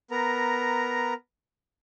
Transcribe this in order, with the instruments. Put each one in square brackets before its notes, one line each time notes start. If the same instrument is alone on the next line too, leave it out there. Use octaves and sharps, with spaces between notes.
[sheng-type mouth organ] B3 A#4 A#5